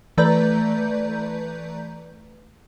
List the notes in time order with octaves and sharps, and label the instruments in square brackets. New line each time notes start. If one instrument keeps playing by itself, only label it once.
[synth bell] E3 A3 B4 D5 A#5 G6